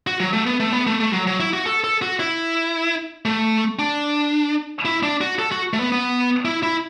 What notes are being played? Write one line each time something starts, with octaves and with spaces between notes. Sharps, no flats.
F#4
F#3
A3
B3
A3
B3
A3
A3
F#3
F#3
E4
F#4
A4
A4
F#4
E4
A3
D4
E4
D4
F#4
A4
F#4
A3
B3
B3
E4
E4